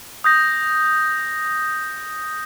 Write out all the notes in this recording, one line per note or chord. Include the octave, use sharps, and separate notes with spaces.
D#6 G6 A#6